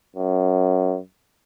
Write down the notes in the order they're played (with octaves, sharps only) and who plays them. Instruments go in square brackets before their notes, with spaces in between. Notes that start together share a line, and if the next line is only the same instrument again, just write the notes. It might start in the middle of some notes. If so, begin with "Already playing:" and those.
[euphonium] F#2